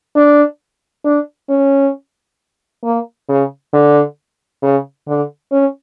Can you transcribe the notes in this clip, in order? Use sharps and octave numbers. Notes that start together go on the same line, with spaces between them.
D4
D4
C#4
A#3
C#3
D3
C#3
D3
C#4